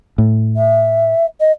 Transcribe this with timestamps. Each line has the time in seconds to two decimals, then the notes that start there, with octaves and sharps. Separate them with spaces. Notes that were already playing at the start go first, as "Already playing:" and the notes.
0.18 A2
0.56 E5
1.40 D#5